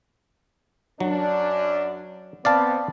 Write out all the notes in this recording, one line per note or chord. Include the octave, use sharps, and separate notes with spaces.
F#2 F#3 D4
B3 C4 D5 F5 A5